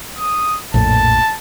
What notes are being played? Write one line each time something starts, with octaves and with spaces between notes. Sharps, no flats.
D#6
A#1 F2 A2 A5